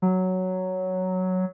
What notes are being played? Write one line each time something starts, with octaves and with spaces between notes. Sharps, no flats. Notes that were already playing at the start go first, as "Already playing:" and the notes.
F#3